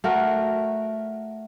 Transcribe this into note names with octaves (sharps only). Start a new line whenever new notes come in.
A3 F#4 A#4